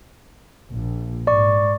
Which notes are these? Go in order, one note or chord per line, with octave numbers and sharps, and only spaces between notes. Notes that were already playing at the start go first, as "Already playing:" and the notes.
A#1
G#2 D5 C#6